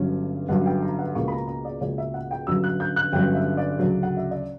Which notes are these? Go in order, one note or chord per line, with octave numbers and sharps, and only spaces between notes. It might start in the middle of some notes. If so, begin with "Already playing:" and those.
Already playing: G1 G2 F#3 C#4
G1 G2 F#3 C#4 F#5
G5
A#5
F#5
C#2 B2 A#3 C#6
B5
A#5
A#5
D5
C#2 B2 A#3 C#5
E5
F#5
G5
G1 G2 F#3 C#4 E6
F#6
G6
F#6
G1 G2 F#3 C#4 G5
E5
D5
D2 C#3 F#3 C#4
F#5
E5
D5